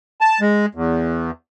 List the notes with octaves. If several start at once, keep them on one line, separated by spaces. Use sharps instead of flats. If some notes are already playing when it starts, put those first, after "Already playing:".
A5
G#3
E2